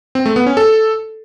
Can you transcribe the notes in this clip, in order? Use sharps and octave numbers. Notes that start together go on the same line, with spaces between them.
C4
A3
B3
C#4
A4